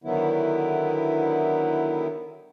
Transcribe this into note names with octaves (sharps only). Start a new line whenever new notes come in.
D3 D#3 F#3 B3 E4